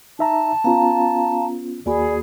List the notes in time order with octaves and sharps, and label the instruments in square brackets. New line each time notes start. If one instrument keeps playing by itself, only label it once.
[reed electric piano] D#4 E5 A#5 [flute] A5
[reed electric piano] B3 C#4 F4 [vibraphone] F5 A#5
[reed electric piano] D#2 A#3 F#4 [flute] G#4 [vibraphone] D5 G#5 B5